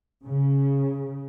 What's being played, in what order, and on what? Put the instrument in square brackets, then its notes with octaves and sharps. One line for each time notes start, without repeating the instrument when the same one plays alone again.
[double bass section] C#3